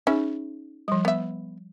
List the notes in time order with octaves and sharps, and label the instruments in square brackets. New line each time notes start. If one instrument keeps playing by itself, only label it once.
[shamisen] C#4 E5 [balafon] D#4 G#4
[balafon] F3 G3
[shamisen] B3 E5